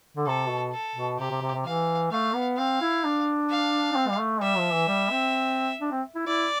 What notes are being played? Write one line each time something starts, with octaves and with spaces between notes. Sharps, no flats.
D3
C3 A4
B2
A4
B2
C3 G4
C3
C3
C3
E3 F5
A3 F5
B3
C4 F5
E4
D4
F5
D4
C4
G3
A3
G3 E5
F3
E3
G3
C4
D4
C4
E4
E4 D5